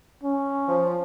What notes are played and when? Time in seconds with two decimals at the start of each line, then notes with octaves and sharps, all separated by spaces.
0.24 C#4
0.68 F3